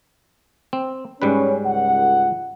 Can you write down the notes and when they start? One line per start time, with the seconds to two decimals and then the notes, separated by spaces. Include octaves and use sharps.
0.73 C4
1.22 G#2 G3 C#4 B4
1.66 C#2 F#5